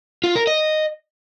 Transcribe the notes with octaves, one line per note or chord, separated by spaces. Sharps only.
F4
A#4
D#5